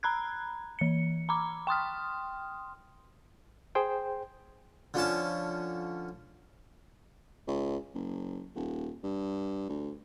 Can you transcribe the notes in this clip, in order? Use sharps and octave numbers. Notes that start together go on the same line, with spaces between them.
A#5 B5 F#6 G#6
E3 C#7
A#5 B5 D6
G5 C6 D#6 F6
G#4 C5 G5
D3 F3 C#4 A5
C#2
F#1
D#1
G2
D2